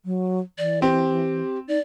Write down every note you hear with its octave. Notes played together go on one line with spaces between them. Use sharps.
F#3
E3 D5
C4 G4
D#4 D5